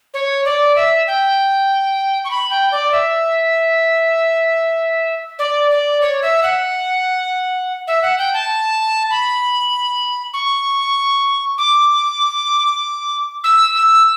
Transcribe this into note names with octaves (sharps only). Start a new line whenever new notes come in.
C#5
D5
E5
G5
C#6
B5
G5
D5
E5
D5
D5
C#5
E5
F#5
E5
F#5
G5
A5
B5
C#6
D6
E6
E6